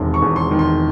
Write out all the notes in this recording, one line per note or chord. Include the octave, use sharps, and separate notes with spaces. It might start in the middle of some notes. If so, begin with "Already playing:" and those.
Already playing: E1 E2 C3 D#3 C6
C#6
E2
C6
D#3
C6